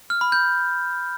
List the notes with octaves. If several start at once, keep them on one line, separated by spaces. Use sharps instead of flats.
F6
B5
G6